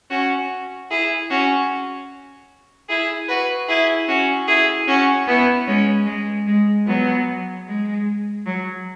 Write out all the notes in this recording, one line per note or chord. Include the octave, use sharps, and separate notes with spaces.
C#4 F#4
E4 G#4
C#4 F#4
E4 G#4
F#4 B4
E4 G#4
C#4 F#4
E4 G#4
C#4 F#4
B3 E4
G#3 C#4
G#3
G#3
F#3 B3
G#3
F#3